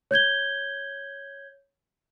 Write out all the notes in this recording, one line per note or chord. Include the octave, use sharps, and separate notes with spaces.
C#5 G6 G#6 G7